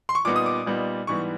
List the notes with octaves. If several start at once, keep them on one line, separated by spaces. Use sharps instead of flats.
C6
C#6
A#2 G3 B3 D#4 D6
D#6
D6
A#2 G3 B3 D#4
G#2 E3 G3 B3 C#6